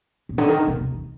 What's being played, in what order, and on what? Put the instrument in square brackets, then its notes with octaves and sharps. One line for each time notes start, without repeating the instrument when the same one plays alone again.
[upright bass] A#2
D3
D#3
D3
C3
C3
D#3